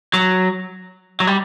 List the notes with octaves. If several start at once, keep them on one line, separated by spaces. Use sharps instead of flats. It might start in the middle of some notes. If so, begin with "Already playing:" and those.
F#3
F#3
G3